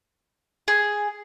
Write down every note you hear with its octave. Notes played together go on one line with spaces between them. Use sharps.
G#4